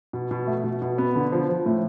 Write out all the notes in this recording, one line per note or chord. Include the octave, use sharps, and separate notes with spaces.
B2
B2
A3
B2
B2
B3
D3
F3
F3
A2